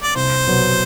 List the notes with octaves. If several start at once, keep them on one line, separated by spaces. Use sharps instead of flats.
D5
C2 C5
B2 F#3 B3